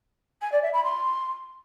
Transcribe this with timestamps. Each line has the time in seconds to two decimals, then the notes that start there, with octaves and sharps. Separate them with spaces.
0.41 G#5
0.52 D5
0.62 E5
0.73 B5
0.84 C6